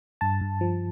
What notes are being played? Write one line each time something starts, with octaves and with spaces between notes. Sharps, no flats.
G2 A5
G2
F3